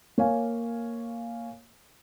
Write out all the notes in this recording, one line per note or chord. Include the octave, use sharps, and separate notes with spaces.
A#3 C#5 F5 G#5